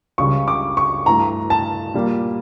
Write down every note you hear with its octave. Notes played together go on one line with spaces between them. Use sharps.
C#2 C#3 G3 C#6
D6
C#6
G2 E3 A3 A#5
A5
A#2 G3 A#3